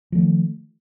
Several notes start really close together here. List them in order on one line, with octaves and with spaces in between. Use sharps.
F3 A3 D#3